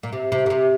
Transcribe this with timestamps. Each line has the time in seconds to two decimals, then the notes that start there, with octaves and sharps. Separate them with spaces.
0.03 A#2
0.13 C3
0.32 C3
0.46 A#2
0.50 C3